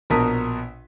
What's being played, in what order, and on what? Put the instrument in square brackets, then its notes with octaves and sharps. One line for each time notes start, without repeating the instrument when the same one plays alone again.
[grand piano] A#1 B2 A#4 A5 D#6 B6